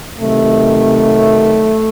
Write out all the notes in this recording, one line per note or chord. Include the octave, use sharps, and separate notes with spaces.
C3 D#3 F#3 A3